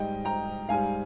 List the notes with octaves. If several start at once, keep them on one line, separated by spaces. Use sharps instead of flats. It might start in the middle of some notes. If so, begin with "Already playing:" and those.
Already playing: G#2 G3 D#5 G5
G5 A#5
G#2 G3 F5 G#5